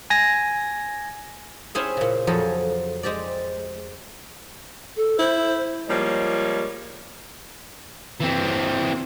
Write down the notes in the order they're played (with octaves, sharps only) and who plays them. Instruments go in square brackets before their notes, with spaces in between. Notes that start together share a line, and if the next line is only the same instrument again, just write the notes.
[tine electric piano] G#5 A#6
[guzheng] C4 C#4 E4 G#4 C5 E5
A#2 C#3
F2 F3 F#3 C#4 G#4 A4
G#3 C4 G4 D5
[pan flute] A4
[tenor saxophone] E4 [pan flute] C5
[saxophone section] F3 G3 G#3 A#3 C#5 D5
[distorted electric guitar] E3 C4